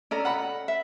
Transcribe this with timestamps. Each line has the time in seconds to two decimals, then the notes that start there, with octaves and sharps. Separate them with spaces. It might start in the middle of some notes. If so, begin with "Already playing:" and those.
0.11 C#4 A4 D5 D#5 A#5
0.25 F#5 B5
0.68 E5